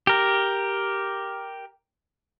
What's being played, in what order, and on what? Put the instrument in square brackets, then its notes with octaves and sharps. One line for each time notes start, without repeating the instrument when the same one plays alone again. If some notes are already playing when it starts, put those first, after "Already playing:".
[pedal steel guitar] G4 A#4